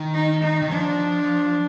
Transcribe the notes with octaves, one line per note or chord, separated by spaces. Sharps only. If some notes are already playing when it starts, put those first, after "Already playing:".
Already playing: D#3
D#4
D#4
D#3
F3 D4